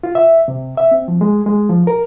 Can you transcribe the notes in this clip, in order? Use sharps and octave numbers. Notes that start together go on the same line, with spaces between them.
F4
E5
C3
E5
C4
F3
G#3
G#3
F3
A#4